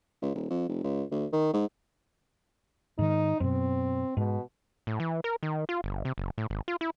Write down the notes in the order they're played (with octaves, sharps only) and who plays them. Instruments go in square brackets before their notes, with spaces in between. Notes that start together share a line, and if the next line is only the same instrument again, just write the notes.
[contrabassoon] C#2
D#1
F2
F1
C#2
D2
D#3
G#2
[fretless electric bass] G#2 D#3 [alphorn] D#4
[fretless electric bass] F#2 B2 [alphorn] C4
[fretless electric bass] G#2 [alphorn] B2
[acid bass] A2
E3
A#4
D#3
F4
G1
C3
F#1
A2
G#1
F4
E4